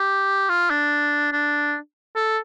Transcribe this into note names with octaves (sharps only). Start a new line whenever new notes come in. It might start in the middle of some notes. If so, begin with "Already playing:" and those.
Already playing: G4
F4
D4
D4
A4